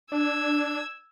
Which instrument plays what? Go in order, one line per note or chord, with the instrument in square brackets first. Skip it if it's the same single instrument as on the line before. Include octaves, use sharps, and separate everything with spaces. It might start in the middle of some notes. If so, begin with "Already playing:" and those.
[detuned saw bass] D4 [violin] E6 G#6